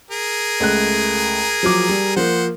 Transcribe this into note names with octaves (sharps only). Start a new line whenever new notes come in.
G#4 A#4
C#2 A3 F#6
F3 F#3 D6
G3
F3 A#3 C5 F#5